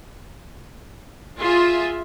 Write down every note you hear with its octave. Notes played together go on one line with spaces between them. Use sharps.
F4 G#4 E5